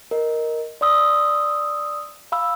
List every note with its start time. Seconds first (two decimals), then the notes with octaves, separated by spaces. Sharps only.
0.11 A#4 D#5
0.81 D5 C6 D#6 E6
2.32 F5 B5 E6